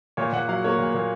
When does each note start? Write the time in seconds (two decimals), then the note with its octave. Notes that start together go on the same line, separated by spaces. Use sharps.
0.17 A#2 C#5
0.33 A#2 F#5
0.48 F#3 F5
0.64 A#3 C#5
0.79 A#2
0.94 A#2